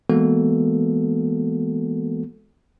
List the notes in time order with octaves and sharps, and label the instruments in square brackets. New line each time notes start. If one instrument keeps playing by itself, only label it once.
[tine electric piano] E3 G#3 A#3 B3 F#4 A4